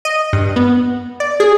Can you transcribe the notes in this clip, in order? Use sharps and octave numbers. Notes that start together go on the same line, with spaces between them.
D#5
G2
B3
D5
G#4